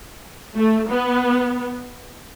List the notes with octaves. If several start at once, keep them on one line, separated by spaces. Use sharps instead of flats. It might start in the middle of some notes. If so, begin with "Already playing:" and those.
A3
B3